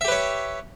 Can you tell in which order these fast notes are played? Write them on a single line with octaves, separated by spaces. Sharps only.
E5 G4 B4 C#5